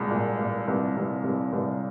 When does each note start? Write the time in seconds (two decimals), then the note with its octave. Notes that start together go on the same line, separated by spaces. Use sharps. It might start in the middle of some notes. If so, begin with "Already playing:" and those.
Already playing: C2 A#2 G#3
0.11 A#2
0.39 A#2
0.68 C2
0.96 C2
1.24 C2
1.52 C2